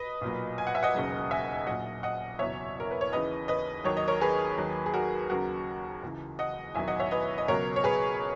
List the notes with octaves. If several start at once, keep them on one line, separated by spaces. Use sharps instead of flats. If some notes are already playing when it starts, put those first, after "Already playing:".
Already playing: B4 D#5
B1 A#2 F#3
G#5
F#5
E5
D#5 F#5
E1 D#2 C#3 F#3
E5 G#5
A#1 A#2 F#3 D#5 F#5
D#5 F#5
F#1 E2 B2 F#3 C#5 E5
A#4
B4
C#5
D#2 C#3 E3 B4 D#5
B4 D#5
D#2 D#3 F#3 C#5
D#5
A#4 C#5
G#4 B4
D#2 D#3 F#3
G#4
F#4 A#4
D#2 C#3 F#3 F#4 A#4
C#2 C#3 E3
D#5 F#5
E1 E2 D#3 F#3 E5 G#5
D#5 F#5
C#5 E5
B4 D#5
D#5
C#2 B2 F#3 A#4 C#5
C#5
G#4 B4